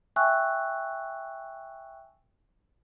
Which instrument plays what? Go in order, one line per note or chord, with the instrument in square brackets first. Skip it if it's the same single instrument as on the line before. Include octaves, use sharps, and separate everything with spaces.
[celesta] E5 G5 G#5 C#6 E6 F#6